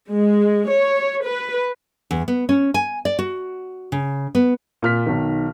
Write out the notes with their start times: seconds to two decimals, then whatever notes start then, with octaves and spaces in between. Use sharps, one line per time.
0.10 G#3
0.70 C#5
1.26 B4
2.11 E2
2.28 B3
2.49 C#4
2.74 G#5
3.05 D5
3.19 F#4
3.92 C#3
4.35 B3
4.82 A#2 F6 B6
5.06 B1 D#3